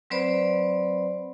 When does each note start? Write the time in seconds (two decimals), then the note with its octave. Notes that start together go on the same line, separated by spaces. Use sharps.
0.10 F#3 C4 B4 C5 D5 B5